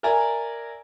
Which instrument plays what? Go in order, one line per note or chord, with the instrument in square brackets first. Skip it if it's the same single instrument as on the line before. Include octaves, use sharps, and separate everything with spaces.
[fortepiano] A#4 D5 E5 G#5 A#5